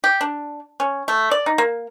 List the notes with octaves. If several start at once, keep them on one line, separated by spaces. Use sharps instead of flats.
G4
D4
C#4
A3
D5
D#4
A#3